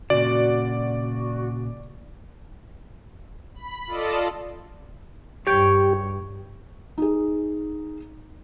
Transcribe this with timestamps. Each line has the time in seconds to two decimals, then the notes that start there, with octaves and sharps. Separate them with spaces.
0.10 A#2 C#3 F#4 D5
3.55 B5
3.87 F4 A4 D5 D#5 A5
5.47 G2 G4 C#5 G5
6.98 D#4 G#4